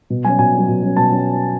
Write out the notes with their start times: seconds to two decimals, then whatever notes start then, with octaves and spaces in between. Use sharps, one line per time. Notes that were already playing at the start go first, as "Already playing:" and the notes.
0.10 B2
0.24 F#3 C#4 G#5
0.39 B2 G#5
0.54 F#3 C#4
0.69 B2
0.82 F#3 C#4
0.96 B2 A5
1.11 F#3 C#4